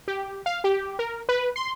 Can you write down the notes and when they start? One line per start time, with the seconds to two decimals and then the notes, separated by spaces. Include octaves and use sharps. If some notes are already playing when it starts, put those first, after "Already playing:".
0.08 G4
0.46 F5
0.64 G4
0.99 A#4
1.29 B4
1.56 C6